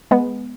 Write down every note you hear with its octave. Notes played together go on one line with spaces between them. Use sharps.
G#3 B3